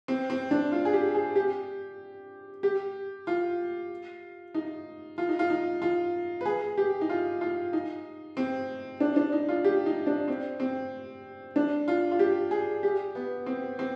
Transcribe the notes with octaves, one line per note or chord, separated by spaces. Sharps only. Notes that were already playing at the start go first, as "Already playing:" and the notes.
C4
C4
D4
F4
G#4
G4
G#4
G4
G4
F4
D#4
F4
D#4
F4
D#4
F4
B4
G#4
G4
D#4
F4
F4
D#4
C4
D4
D4
D#4
F4
G4
D#4
D4
C4
C4
D4
F4
F4
G4
G#4
G4
B3
C4
C4